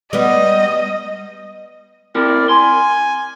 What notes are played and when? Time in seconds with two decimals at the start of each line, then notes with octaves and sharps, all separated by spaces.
0.13 G3 B3 D#5
2.15 C4 E4 A#4 D5
2.49 G#5 C6